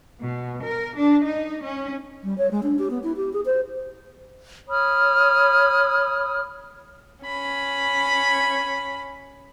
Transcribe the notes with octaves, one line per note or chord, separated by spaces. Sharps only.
B2
A#4
D4
D#4
C#4
G3
C#5
G#3
D4
G4
B3
E4
G4
G#4
C5
C#5 B5 D#6 F6
C#4 B5